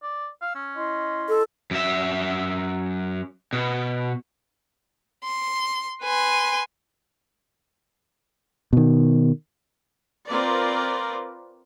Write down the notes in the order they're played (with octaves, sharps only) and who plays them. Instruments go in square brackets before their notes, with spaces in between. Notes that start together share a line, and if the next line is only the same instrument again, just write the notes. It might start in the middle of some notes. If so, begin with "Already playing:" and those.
[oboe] D5
[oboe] F5 [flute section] E6
[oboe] C#4
[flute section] E4 D#5 C6
[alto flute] A4
[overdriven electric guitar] F#2 E5
B2
[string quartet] C6
B4 G#5 C6
[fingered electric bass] B2 D#3
[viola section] C4 F4 A#4 B4 D5